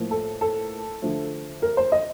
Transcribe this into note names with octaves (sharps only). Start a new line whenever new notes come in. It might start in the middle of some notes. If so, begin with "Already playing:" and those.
Already playing: A2 F3 A#3
A4
A4
D3 F3 A3
A#4
C5
D#5